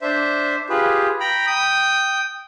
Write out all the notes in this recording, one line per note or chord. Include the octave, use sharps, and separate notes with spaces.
D4 C5 E5
F4 G4 G#4 B4
G5 A#5 B5
G5 D#6